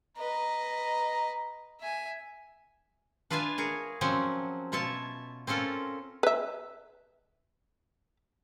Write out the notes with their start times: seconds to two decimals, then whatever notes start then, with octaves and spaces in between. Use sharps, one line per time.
0.17 B4 D#5 A#5
1.81 E5 G#5
3.30 D4 F4 B4 E5 F5 G#5
3.58 G#4 A#4 C#5
4.01 F3 F#3 C4 C#4
4.72 B2 F4 C#5 E5 A5
5.47 C4 C#4 F4 A4 A#4
6.23 B4 E5